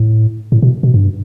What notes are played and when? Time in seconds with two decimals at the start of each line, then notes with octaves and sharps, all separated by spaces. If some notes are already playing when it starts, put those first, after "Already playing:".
Already playing: A2
0.52 A2
0.62 B2
0.83 B2
0.94 G2